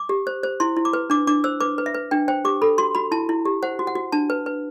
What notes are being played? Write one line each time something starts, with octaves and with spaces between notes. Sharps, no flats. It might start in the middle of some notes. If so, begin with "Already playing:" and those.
Already playing: D6
G4
C5
C5
E4 C6
E4
D6
B4
D4 D6
D4 D6
C5 E6
B4 D6
B4
E5
B4
D4 G5
C5 G5
G4 D6
A4 B5
F#4 C6
F#4 B5
E4 A5
E4
G4
C5 F#5
F#4
F#5
F#4
D4 A5
B4
B4